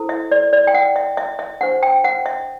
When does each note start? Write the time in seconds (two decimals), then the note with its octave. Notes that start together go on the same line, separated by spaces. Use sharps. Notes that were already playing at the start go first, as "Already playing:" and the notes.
Already playing: E4 A4 C5
0.09 E5
0.31 D5
0.53 D5
0.67 G5
0.74 F#5
0.96 E5
1.17 E5
1.39 E5
1.61 D4 G4 C5 F#5
1.83 G5
2.04 F#5
2.26 E5